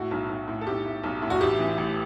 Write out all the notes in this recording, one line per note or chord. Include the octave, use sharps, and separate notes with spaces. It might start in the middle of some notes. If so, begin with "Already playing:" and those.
Already playing: A2 F#4
B1
B1
A2
A4
A2 G4
A2
B1
A2
F#4
A1 G4
E3
A1